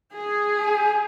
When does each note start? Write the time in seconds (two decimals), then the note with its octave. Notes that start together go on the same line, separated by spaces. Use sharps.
0.13 G#4
0.57 G#5